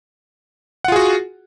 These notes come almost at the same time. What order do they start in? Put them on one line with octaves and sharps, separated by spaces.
F#5 F4 G#4 F#4